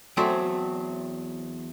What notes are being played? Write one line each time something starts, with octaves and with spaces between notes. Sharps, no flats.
E2 F#3 A3 C4 C5 D5